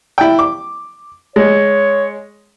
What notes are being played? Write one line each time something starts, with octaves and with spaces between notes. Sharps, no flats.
E4 G5
D6
G#3 C#5